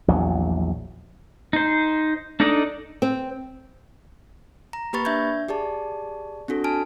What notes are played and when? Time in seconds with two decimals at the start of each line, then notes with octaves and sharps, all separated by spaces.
0.08 A#1 E2 F#3
1.53 D#4 C5
2.40 D4 D#4 A4 D5 D#5
3.02 C4
4.73 A#5
4.93 A#3 G4 B4 B5 C#6 A6
5.05 D4 E5 G6 G#6
5.49 G4 G#4 D5 A5
6.48 C4 D4 F#4 A4
6.64 G#5 A5 F6 D7